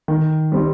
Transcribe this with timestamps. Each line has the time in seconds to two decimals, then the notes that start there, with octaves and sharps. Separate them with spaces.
0.08 D#3
0.52 G3 C4 D#4